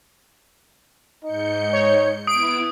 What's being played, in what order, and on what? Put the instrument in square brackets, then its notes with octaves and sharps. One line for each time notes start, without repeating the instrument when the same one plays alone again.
[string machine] G#2 G6 C#7 [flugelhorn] D#4
[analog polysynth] C#5
[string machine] B3 E4 [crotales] D#6 [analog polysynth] D7